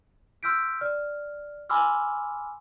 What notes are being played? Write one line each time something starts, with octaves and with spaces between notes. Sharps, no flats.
C6 E6 F6 G6 B6 D7
D5 F6
G#5 B5 C6 D6 E6 F6